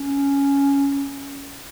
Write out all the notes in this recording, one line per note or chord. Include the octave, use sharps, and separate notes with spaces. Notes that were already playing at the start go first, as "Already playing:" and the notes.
Already playing: C#4